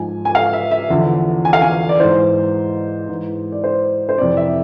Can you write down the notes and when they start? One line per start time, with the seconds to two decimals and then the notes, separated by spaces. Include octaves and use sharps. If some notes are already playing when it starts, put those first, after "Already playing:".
Already playing: G#2 F3 G#5
0.25 G#5
0.35 F5
0.53 E5
0.71 E5
0.90 E2 D3 F3
1.45 G#5
1.53 F5
1.62 G#5
1.89 D5
2.00 G#2 E3 C5
3.09 G#2 E3
3.52 D5
3.64 C5
4.09 C5
4.18 F2 C3 E3 D5
4.37 E5